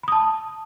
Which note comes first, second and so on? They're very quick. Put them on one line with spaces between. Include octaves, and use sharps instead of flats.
B5 D#6 A5